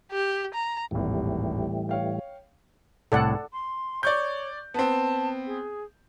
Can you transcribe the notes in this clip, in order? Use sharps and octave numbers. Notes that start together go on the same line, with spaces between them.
G4
A#5
D#1 G#1 A2 E3 G3
C#5 F5 G5
C2 A2 A4 D5 F#5
C6
C#5 D5 C#6 G6
B3 C4 A5
G#4